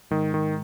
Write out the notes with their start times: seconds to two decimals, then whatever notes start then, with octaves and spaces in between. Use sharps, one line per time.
0.11 G#2 D#3
0.34 D#3